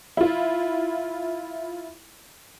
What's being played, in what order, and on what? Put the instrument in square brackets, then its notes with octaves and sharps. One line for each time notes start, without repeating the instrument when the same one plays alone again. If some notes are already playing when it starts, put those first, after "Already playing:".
[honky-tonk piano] E4 F4